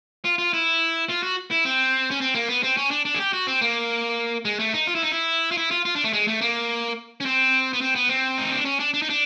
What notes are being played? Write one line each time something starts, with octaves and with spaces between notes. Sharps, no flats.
F4
F4
E4
F4
F#4
E4
C4
C#4
C4
A#3
B3
C4
C#4
D4
D4
G#4
G4
F#4
C4
A#3
G#3
A3
D#4
F4
E4
D#4
E4
F4
E4
F4
F4
D4
A3
G#3
A3
A#3
C#4
C4
B3
C4
B3
C4
D#4
D4
C#4
D4
D4
D#4
D4